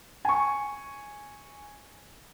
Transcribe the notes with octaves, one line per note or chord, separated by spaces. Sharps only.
G#5 C#6